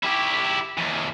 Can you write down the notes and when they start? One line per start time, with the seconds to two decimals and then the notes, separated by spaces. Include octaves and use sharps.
0.03 E4 G4
0.78 D#2 E3